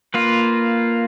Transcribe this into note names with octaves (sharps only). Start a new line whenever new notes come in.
A#3 F4 B4